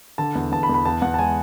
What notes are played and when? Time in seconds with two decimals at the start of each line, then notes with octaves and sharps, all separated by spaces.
0.18 D3 A5
0.35 E2
0.52 E2 A5
0.63 B5
0.69 E2
0.74 B5
0.85 E2 A5
1.02 E2 F#5
1.14 A5
1.19 G#3 G#5